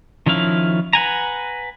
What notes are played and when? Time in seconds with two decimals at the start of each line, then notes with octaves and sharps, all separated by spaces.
0.26 D#3 F3 C#4 E4 F5
0.93 B4 F#5 G#5 A#5